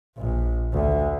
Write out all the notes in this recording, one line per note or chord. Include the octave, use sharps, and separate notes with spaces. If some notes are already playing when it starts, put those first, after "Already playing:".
A#1
D2